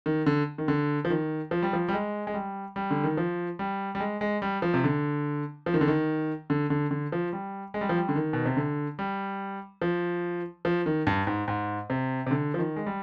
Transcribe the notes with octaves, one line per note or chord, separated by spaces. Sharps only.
D#3
D3
D#3
D3
F3
D#3
F3
G3
F3
G3
G#3
G#3
G3
G3
D3
D#3
F3
G3
G3
G#3
G#3
G3
F3
C3
D3
F3
D#3
D3
D#3
D3
D3
D3
F3
G3
G#3
G3
F3
G3
D3
D#3
B2
C3
D3
G3
F3
F3
D#3
G2
G#2
G#2
C3
C3
D3
F3
D#3
G#3
G3